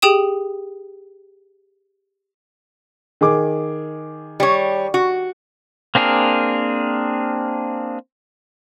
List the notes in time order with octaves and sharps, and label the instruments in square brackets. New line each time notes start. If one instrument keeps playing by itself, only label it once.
[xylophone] G4 G#4 G5 D#6 E7
[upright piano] D#3 G#4 D6
[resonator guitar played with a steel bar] G3 C#5
F#4
[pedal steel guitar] A#3 C4 D4 G#4 A#4